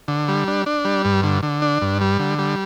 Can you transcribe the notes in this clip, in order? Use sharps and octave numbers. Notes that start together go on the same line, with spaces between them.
D3
G3
D4
D4
G3
G2
D3
D3
D4
G2
G3
D3
G3